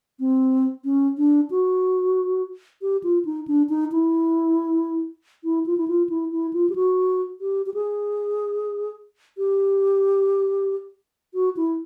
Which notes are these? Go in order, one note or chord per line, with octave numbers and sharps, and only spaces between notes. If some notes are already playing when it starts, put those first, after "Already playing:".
C4
C#4
D4
F#4
G4
F4
D#4
D4
D#4
E4
E4
F4
E4
F4
E4
E4
F4
G4
F#4
G4
G4
G#4
G4
F#4
E4